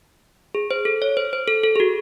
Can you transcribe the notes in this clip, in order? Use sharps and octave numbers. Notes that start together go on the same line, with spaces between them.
G#4
C5
A4
C#5
C5
C5
A4
A4
G#4
F#4